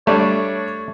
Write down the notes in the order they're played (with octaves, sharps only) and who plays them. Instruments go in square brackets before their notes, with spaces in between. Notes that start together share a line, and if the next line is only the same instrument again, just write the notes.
[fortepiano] G3 D4 [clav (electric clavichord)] A3 [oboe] C#5